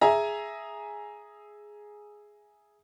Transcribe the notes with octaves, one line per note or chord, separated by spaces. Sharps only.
G#4 E5 G#5 A#5